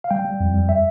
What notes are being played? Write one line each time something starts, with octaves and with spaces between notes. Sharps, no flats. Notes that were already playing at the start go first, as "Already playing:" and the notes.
F5
G3 G5
G3
F2
G3
E5